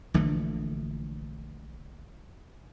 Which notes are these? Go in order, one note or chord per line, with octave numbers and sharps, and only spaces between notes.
A#1 D3 E3 A3